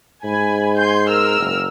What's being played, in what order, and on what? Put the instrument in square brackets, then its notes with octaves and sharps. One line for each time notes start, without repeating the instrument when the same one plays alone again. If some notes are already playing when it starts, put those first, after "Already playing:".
[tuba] G#2 [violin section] G#5 B5
[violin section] G#5 C6 G6
A#4 E6 F6
[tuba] F#1